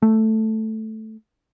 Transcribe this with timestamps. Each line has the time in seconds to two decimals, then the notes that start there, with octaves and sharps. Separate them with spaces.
0.02 A3